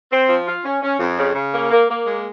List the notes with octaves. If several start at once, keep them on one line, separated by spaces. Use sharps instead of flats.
C4
F3
F4
C#4
C#4
F2
C#3
C#3
A#3
A#3
A#3
G#3